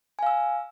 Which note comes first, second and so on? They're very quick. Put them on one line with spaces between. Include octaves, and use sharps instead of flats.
G#5 F5 E6